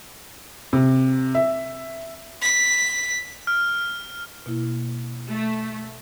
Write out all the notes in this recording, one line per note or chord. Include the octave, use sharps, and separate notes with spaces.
C3
E5
B6
F6
B2 A#3 E4
A3